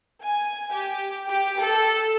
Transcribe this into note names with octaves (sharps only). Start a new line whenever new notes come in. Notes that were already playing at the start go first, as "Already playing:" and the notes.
G#5
G4
G4
A4